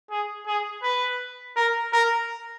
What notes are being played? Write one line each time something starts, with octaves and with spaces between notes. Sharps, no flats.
G#4
G#4
B4
A#4
A#4